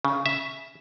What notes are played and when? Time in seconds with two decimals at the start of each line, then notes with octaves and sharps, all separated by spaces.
0.05 C#3
0.26 E5